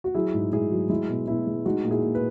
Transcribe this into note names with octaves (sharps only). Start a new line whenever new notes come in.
F#4
F#3 E4 G#4
G#2
G#2 E4 G#4
F#3
G#3 E4
B2
B2 E4
G#3
G#3 D#4 F#4
A#2
E4 G#4
A#2
B4